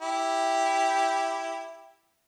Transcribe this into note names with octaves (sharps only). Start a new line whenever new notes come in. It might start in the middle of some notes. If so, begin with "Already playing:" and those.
E4 G4